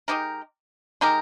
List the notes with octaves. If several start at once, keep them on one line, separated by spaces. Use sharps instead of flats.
G#3 D#4 G4 A#4
G#3 D#4 G4 A#4